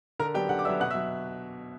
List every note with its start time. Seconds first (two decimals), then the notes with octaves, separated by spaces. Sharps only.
0.19 D3 A#4 A#5
0.34 F#3 B3 D4 G4 G5
0.49 D3 F#5
0.59 D6
0.65 F#3 B3 D4 E5 E6
0.80 B2 F#5 F#6
0.90 E5 E6
0.95 F#3